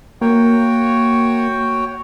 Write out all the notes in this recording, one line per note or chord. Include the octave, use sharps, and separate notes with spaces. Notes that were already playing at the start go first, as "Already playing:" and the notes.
A#3 F#4 C#5 G5